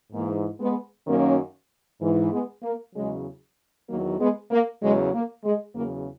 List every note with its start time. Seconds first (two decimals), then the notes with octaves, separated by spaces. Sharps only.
0.13 G#2 E3 A#3
0.60 G#3 B3
1.07 F#2 D#3 F#3 A#3 C#4
2.01 G#2 E3
2.32 G#3 B3
2.63 A#3
2.95 E2 C#3 F#3 G#3
3.88 E2 D#3 F#3 A#3
4.20 G#3 B3
4.51 A#3
4.82 E2 C#3 F#3 G#3
5.14 A#3
5.44 G#3
5.75 E2 C#3 F#3 A#3